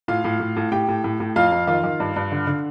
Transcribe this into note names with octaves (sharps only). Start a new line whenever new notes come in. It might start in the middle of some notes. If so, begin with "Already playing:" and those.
A2 F4 F5
A2
A2
A2
A2 G4 G5
A2
A2
A2
F2 F4 F5
F2
D#3 F4 F5
D#3
G2
G2
D3
D3